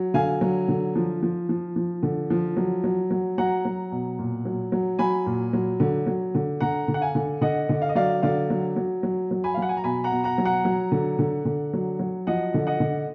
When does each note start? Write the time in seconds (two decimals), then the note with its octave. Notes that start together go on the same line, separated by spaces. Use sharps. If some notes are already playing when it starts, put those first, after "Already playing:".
Already playing: F#3
0.14 D3 F5 G#5
0.41 F#3
0.68 D3
0.95 F3
1.22 F3
1.49 F3
1.76 F3
2.03 D3
2.30 F3
2.57 F#3
2.84 F#3
3.11 F#3
3.38 F#3 F#5 A#5
3.65 F#3
3.92 B2
4.19 A#2
4.45 F#3
4.72 F#3
4.99 F#3 G#5 B5
5.26 A#2
5.53 F#3
5.80 D3
6.06 F#3
6.35 D3
6.60 D3 F#5 A#5
6.88 D3
6.94 F#5
7.01 F5 G#5
7.15 D3
7.41 D3 D#5 F#5
7.69 D3
7.82 F5
7.89 D#5
7.95 F#3 D5 F5
8.22 D3 D5 F5
8.50 F#3
8.76 F#3
9.03 F#3
9.31 F#3
9.44 G#5 B5
9.54 F5
9.57 F#3 F#5
9.69 G#5
9.77 A#5
9.84 B2 G#5 B5
10.04 F#5 A#5
10.11 B2
10.24 F#5 A#5
10.38 F#3
10.45 F#5 A#5
10.65 F#3
10.92 D3
11.19 D3
11.45 D3
11.73 F#3
11.99 F#3
12.27 F3 D#5 F#5
12.54 D3
12.67 D#5 F#5
12.80 D3